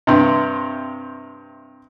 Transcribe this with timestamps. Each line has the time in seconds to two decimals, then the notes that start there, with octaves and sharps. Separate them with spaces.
0.07 G2 C3